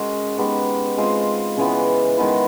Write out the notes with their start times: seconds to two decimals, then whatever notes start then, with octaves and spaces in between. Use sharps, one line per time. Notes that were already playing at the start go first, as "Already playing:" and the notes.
Already playing: G#3 C#4 F#4 A#4
0.38 G#3 B3 D#4 G4
0.98 G#3 C4 F4
1.57 C#3 E3 G#3 B3
2.17 D#3 G#3 B3 E4